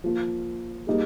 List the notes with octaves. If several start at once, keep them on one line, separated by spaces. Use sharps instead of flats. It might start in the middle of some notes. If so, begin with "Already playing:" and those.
F3 A#3 F4
G3 A#3 D#4 G#4